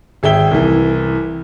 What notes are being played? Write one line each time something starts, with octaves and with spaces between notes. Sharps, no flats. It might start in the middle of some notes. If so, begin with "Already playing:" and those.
G#1 G#4 E5 G5 G7
C2 E3